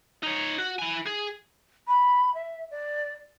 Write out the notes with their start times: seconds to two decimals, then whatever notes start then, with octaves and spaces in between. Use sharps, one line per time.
0.23 D#4 C#5
0.59 F#4
0.79 E4 G#5
1.06 G#4
1.88 B5
2.34 E5
2.71 D5